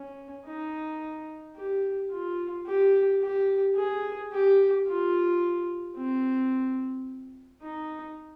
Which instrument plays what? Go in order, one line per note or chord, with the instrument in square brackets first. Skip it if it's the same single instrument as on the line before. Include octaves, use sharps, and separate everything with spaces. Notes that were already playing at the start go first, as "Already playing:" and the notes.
Already playing: [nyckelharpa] C#4
D#4
G4
F4
G4
G4
G#4
G4
F4
C4
D#4